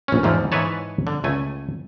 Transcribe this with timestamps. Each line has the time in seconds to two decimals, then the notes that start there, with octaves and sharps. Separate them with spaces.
0.08 A#1 C#4
0.23 E2 G#2 E3 F3
0.52 G#2 E3 G#4 B4 C#5 A5
1.07 D3
1.24 C#2 A3 G#5